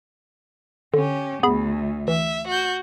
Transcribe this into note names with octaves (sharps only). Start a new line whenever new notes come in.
D3 C#4 G4
D2 B3 G#4 B5
E3 E5
F#4 G6